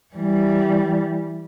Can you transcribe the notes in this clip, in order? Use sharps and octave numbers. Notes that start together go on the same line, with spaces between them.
E3 G3